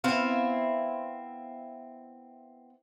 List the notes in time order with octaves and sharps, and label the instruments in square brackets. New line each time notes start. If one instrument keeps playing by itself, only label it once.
[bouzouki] B3 C4 E4 F5